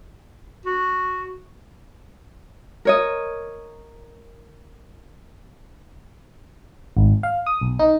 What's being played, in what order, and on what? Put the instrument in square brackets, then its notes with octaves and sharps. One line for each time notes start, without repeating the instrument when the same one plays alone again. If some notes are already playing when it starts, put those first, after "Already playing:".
[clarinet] F#4
[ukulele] A#4 C#5 D#5
[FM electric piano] G#1
F5
D#6
B1
D#4